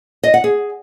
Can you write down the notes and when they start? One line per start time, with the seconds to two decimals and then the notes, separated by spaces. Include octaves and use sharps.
0.23 D#5
0.34 F#5
0.44 G#4